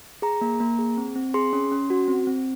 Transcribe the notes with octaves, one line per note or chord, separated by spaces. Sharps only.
G#4 A#5
A#3
A#3
G#4
C4
C4
G#4 C6
C#4
C#4
F#4
C4
C4